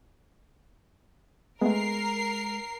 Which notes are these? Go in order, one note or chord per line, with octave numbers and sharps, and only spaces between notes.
G#3 A3 B3 A#4 C7